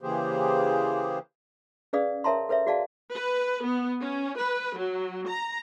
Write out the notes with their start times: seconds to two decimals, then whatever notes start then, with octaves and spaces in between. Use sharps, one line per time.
0.01 C#3 E3 A#3 G4 G#4 C5
1.93 C#4 G#4 B4 D5 F5 D#6
2.24 A#4 C#5 E5 A5 A#5 C6
2.49 A4 B4 C#5 E5
2.67 F#4 G#4 D5 F5 A5
3.14 B4
3.66 B3
4.00 C#4
4.40 B4
4.78 F#3
5.29 A#5